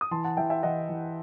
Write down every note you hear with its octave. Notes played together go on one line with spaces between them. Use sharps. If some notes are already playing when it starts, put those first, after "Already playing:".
D#6
E3 A5 C6
F#5 A5
E3 E5 G5
E5 G5
E3 D#5 F#5
E3